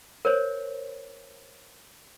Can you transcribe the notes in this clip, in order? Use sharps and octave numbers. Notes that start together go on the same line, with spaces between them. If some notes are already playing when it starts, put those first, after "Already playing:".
A#4 C5 C#5